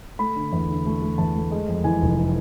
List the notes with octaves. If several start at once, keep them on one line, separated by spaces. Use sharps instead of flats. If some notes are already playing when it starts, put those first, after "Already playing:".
A3 B5
D3
E2
D3
A3
A3
E2 A5
A3
G#3
F2
E3 G#5
F1